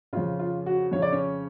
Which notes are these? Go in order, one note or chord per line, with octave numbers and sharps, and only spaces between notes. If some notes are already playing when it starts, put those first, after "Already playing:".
F2 C#3 F4
F4
F#4
F2 C#3 C#5
D5
C#4 C#5